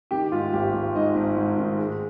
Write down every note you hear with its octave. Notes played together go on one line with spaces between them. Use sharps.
D#3 G4
G#2 F4
G#1 G4
G#1
G#2 D#5
G#1
G#2
D#3
G#3